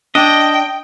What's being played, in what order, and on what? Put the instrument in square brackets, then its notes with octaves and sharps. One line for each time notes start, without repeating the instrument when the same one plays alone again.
[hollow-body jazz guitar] D4 [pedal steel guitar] D#5 [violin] G5